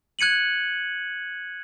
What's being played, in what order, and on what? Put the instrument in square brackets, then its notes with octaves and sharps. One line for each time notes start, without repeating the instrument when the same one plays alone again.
[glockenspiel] F#6 G#6 C#7 D#7 F#7